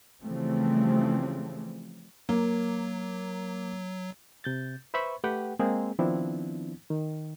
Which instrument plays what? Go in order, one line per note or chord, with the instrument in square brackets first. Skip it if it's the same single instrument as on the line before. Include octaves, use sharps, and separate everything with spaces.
[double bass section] C#3 E3 F3 G3 A3 C4
[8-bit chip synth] F#3 [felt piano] A#3
[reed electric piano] C3 G6 A6
B4 C5 E5 B5 C#6
A3 G4 B4 F#5 G5
G#3 A#3 C4 G#4
D#3 F3 B3 C4 D4 E4
D#3